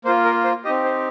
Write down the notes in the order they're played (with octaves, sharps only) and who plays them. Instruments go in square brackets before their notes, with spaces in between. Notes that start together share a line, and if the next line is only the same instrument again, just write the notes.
[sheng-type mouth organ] A#3 C5
F4
A#4
C5
C4 D#4 G4 D#5
C5